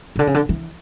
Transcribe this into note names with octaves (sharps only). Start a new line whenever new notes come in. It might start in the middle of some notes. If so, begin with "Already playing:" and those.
C#3
D3
C#3
D3
E3